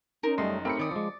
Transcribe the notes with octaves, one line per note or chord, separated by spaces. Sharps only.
C#4 D#4 A#4 C5
F#1 G3 A3 D#5 C6
A3 C4 G4 A#4 B5 C#7
D#3 D5 D#6
F3 G#3 D6